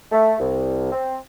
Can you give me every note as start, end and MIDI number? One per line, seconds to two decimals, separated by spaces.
0.12 0.36 57
0.40 0.89 36
0.92 1.16 60